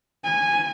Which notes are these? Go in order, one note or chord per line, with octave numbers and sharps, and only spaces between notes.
G#5